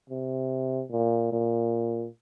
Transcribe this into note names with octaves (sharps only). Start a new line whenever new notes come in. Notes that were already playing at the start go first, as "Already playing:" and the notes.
C3
A#2
A#2